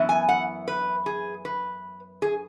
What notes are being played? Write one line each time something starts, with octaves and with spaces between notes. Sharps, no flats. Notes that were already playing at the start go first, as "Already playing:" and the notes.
Already playing: F#2 E3 B3 E4
G#5
F#5
B4
G#4
B4
G#4